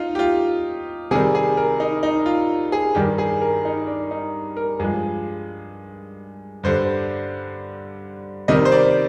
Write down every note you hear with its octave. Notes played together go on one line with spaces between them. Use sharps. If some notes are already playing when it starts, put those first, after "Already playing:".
Already playing: D#4 F4
G4
F4
C3 D#3 G3 G#4
G#4
A#4
D#4
D#4
F4
G#4
G2 D#3 G3 G4
G#4
A#4
D#4
D4
D#4
A#4
G2 F3 G#3 G#4
G2 D3 G3 C5
C3 D#3 G3 D#5
C5
D5